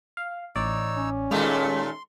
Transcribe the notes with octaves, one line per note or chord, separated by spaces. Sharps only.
F5
A1 D#4 C#5 D5 E6
C#4
D#2 A#2 G#3 A3 E4 F4 G4
C6